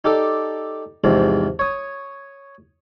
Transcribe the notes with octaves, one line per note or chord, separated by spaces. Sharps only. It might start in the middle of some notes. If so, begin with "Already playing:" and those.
D#4 G4 A4 D5
E2 G#2 C3 F3
C#5 D#6